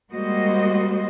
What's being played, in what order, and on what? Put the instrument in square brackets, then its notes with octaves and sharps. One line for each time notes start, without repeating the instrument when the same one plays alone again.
[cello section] G3 G#3 A#3 F#4 C5 D#5